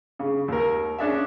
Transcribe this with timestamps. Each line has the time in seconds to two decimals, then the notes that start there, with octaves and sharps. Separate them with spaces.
0.19 C#3
0.48 D#2 A#4
0.98 C#4 D4 G#4 E5